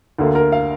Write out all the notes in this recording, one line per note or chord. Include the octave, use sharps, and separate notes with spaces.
D2 D3 A#3
A#4
F5